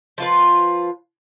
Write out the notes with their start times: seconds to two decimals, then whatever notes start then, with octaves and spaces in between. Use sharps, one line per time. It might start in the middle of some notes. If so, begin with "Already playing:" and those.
0.18 F3 F4 B4